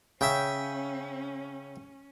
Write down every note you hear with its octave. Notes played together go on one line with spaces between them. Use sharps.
C#3 C#4 E5 G5